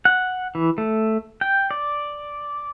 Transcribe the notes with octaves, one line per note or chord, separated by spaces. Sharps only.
F#5
E3
A3
G5
D5